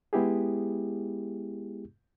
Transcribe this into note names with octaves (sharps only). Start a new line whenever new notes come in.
G#3 B3 E4 G4 G#4